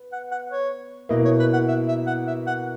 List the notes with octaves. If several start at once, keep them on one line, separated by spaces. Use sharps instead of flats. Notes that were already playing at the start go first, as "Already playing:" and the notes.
Already playing: B3
F#5
F#5
C#5
B2 A#3 E4 D#5
C#5
B4
F#5
E5
E5
F#5
E5
F#5